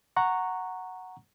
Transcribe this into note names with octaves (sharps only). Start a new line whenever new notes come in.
F#5 A#5 C#6